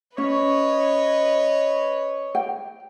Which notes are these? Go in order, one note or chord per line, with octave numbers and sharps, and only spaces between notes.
C#4 B4 C#5 D#5
G5